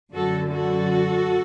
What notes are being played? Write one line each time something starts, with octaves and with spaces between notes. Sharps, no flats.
F#2 D3 F#3 F#4 A4
F#4 A4